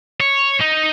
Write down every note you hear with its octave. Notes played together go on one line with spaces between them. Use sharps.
C#5
D#4